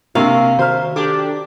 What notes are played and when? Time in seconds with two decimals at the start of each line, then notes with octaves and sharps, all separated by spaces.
0.15 C3 A#3 D4 F5 C#6 E6
0.59 D#3 F#4 C5 A#5 F6
0.96 D4 G4 A4 D6